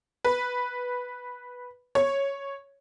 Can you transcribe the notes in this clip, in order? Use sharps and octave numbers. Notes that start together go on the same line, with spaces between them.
B4
C#5